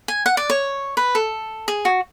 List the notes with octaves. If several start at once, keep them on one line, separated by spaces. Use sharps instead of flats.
G#5
F#5
D5
C#5
B4
A4
G#4
F#4